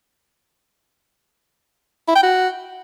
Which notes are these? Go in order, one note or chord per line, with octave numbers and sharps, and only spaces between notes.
E4
G5
F#4